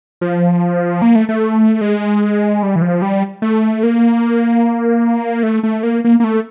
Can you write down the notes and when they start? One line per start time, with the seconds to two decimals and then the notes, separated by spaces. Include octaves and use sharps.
0.21 F3
1.02 A#3
1.15 A3
1.29 A3
1.81 G#3
2.63 G3
2.76 E3
2.82 F3
3.02 G3
3.42 A3
3.83 A#3
5.43 A3
5.63 A3
5.83 A#3
6.04 A#3
6.20 A#3
6.24 A3